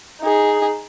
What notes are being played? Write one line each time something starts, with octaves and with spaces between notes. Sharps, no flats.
D#4 G#4